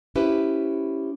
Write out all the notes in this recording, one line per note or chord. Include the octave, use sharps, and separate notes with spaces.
C#4 E4 G4 B4 C5